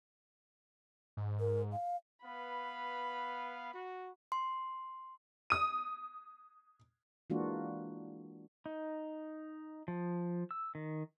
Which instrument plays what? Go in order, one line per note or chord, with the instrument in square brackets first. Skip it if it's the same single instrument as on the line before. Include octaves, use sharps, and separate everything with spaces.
[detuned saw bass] G#2
[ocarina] A#4
F5
[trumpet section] B3 B4 F5 [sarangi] B5
[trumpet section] F#4
[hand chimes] C6
[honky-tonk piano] D#6 D#7
[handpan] E3 G#3 A#3 D4 F4 F#4
[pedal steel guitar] D#4
F3
E6
D#3